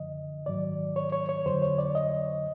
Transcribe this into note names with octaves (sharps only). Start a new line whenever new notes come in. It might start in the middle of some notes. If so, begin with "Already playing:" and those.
Already playing: F#2 D3 F3 D#5
G#2 D#3 F#3 D5
C#5
C#5
C#5
F2 D3 F#3 C5
C#5
D5
D#5